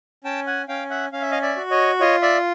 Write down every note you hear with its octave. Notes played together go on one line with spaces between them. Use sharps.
C#4 G5 A5
F#5 G#5
C#4 F5 G5
E5 F#5
C#4 F5
E5
D#5 F5
D5 E5
F#4
C#5 D#5
F4 C#5 D#5
D5 E5